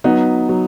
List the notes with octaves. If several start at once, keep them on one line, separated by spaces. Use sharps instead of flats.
F#3 B3 D#4
F#3